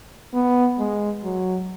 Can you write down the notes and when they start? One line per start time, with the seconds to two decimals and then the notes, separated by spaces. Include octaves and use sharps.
0.34 B3
0.79 G#3
1.24 F#3